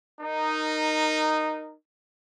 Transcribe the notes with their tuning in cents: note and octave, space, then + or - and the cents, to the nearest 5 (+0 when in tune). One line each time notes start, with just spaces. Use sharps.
D#4 -10 A#4 +0